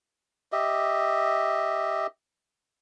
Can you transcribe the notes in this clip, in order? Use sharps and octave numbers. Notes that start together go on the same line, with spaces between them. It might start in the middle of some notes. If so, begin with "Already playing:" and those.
G4 D#5 E5